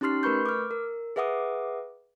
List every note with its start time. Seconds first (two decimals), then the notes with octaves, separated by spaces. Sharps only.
0.01 C#4 D#4 G4 C6 F6 C7
0.23 A3 A#4 B4 B5 C#6 G6
0.46 D6 F6
0.71 A#4
1.16 G#4 B4 E5 F#5 D6 D#6